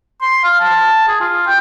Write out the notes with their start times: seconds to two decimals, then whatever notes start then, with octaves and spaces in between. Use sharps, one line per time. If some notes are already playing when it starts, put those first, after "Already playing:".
0.21 C6
0.44 F5
0.60 A5
1.08 G#4
1.20 F4
1.47 G5